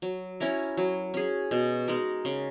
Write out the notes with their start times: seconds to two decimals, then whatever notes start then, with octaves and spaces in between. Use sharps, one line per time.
0.02 F#3
0.40 C#4 E4 A#4
0.77 F#3
1.14 C#4 G#4
1.51 B2
1.88 G#3 D#4 A#4
2.25 C#3